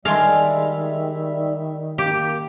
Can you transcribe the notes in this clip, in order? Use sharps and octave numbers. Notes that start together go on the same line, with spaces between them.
D#3 G3 G#3 D4 G#4 E5 F5
A#3 G4